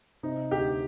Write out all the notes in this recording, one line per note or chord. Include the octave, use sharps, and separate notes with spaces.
C3 D#4
D2 G4